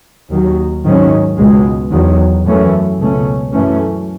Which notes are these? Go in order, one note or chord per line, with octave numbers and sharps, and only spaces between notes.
D#2 D#3 F#3
G#2 D#3 F#3 C#4
C#2 B2 G#3
E2 D#3 F#3
F#2 E3 A3 C#4
C#2 B2 A3 C#4
F#2 E3 A3 C#4